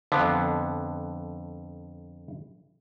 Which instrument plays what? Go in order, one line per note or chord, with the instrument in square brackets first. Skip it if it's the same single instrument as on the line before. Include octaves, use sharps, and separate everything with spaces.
[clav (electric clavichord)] F2 D3 B3